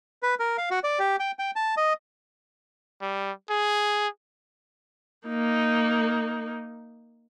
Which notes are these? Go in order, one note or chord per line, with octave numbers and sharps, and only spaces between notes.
B4
A#4
F5
F#4
D5
G4
G5
G5
A5
D#5
G3
G#4
A#3 D#4